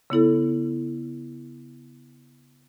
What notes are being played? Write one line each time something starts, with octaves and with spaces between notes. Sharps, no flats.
C#3 B3 E4 A4